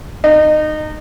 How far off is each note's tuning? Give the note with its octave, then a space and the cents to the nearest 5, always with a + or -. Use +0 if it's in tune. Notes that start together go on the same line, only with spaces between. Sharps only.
D#4 -25